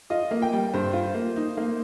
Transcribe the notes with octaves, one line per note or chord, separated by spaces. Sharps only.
F4 D#5
A#3
G5
G3
G2 C5
F4
A#3
D#4
A#3